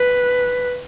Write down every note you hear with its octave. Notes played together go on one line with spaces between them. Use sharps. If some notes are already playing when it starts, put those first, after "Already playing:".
Already playing: B4